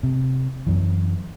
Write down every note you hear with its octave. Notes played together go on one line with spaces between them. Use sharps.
C3
F#2 E3